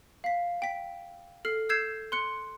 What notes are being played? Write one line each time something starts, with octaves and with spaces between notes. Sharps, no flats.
F5 B6
G5 B6
A4 F6 C7
E6 G6 G#6 C7 E7
C6 F#6 C#7